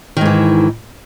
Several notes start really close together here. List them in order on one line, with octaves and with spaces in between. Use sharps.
D#3 G#2 E3